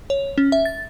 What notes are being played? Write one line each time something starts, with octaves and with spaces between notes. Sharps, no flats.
C#5
C#4
E5
A6